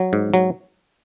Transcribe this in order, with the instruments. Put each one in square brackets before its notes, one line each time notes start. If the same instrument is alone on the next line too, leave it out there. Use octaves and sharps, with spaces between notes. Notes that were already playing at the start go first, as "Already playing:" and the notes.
Already playing: [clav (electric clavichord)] F#3
G#2
F#3